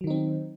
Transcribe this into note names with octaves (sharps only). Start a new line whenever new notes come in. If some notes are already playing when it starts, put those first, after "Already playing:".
D#3 F#3 C4 D#4